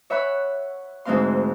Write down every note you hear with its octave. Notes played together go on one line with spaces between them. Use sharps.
C#5 E5 F#5 B5 C#6
D2 G#2 E3 C4 F5 C6